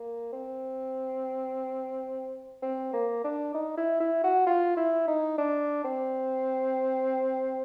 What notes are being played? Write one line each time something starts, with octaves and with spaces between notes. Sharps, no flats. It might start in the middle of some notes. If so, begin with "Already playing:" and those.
Already playing: A#3
C4
C4
A#3
D4
D#4
E4
E4
F#4
F4
E4
D#4
D4
C4